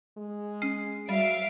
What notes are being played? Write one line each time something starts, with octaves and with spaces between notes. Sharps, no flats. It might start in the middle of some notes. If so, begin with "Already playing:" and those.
G#3
C#4 C7
F#3 G3 E5 F5 D7